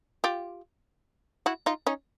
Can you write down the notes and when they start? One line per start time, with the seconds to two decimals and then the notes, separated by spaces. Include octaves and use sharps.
0.24 F4 G4
1.46 E4 F#4
1.66 D#4 F4
1.86 C#4 D#4